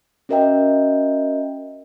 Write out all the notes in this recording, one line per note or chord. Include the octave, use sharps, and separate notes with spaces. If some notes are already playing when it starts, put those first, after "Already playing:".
C#4 F#4 A#4 D#5 E5 G5